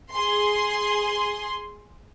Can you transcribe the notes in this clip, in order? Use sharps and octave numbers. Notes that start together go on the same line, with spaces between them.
G#4 C6